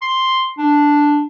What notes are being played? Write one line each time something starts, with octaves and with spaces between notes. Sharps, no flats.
C6
D4